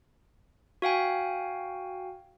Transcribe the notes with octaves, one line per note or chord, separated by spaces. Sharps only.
F#4 F5 G5 G#5